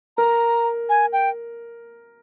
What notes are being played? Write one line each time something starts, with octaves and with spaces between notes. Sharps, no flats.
A#4 A#5
G#5
G5